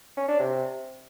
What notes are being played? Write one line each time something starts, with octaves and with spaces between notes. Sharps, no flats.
C#4
D4
C3